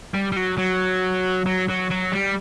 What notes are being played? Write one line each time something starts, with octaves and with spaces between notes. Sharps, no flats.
G3
G3
F#3
F#3
F#3
F#3
F#3
G3